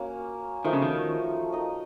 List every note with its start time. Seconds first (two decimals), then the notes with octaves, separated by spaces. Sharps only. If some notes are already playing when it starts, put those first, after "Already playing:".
Already playing: A#3 C#4 F#4
0.65 D#3 F3 A3 D#4 F#4
0.73 C#3
0.82 D#3
1.52 D#4 A#4 D#5